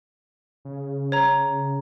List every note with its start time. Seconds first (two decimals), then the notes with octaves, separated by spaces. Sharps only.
0.65 C#3
1.12 C#5 A#5